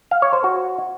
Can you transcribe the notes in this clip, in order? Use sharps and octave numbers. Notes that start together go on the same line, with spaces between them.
F5
C#5
C5
F#4